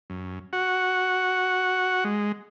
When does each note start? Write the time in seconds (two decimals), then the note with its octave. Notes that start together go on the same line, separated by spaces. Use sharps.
0.10 F#2
0.53 F#4 F#5
2.04 G#3